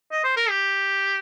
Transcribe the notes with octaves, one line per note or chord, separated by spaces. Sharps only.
D#5
C5
A#4
G4